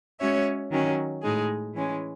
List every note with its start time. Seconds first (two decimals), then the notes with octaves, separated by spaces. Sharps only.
0.20 G#3 C#4 F#4 C#5 E5
0.71 D#3 F#3 C#4
1.23 A2 G#3 D#4 G#4
1.73 E3 G#3 C#4